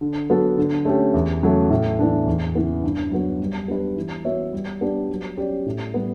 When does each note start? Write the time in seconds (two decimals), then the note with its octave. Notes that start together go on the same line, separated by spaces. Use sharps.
0.01 D3
0.30 F#3 B3 F#4 A4
0.57 D3
0.85 A3 C#4 G4
1.14 E2
1.42 C#3 F#3 A3
1.70 A2
1.99 E3 B3 D4
2.26 E2
2.55 C#3 E3 B3
2.84 G2
3.11 F#3 B3 F#4
3.40 G3
3.68 B3 D4 G4 B4
3.96 E3
4.25 B3 F#4 C#5 E5
4.53 G3
4.81 B3 D4 G4 D5
5.09 F#3
5.37 C#4 G4 D5
5.66 A2
5.94 G3 B3